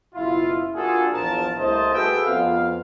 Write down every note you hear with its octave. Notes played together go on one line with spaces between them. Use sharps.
F#1 B2 E4 F4
A#3 D4 F4 F#4 G#4 A4
A#1 E2 A#2 F3 A#4 A5
C2 A3 A#3 C5 D#5 A5
F#4 G#4 A4 B4 E5 G5
F2 B3 C4 F5